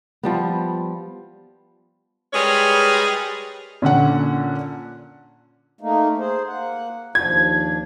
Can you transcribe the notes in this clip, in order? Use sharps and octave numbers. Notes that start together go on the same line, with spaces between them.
F3 G3 B3
G3 G#3 G#4 A#4 B4 C#5
A#2 D3 C#4 F#5
A3 A#3 D#4
G#4 C5
A#3 F#5
D#2 F3 D4 G#6